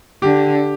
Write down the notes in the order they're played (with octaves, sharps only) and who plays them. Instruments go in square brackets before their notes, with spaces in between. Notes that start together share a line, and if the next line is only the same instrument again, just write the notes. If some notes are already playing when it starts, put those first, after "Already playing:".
[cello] D3 [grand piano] G4